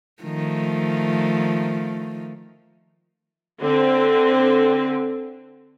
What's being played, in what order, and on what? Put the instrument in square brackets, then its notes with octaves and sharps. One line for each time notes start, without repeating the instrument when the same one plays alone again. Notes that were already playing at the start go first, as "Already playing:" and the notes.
[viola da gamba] D#3 F3 A3
[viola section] D3 C4